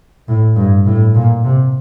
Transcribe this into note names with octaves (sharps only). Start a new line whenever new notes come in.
A2
G2
A2
A#2
C3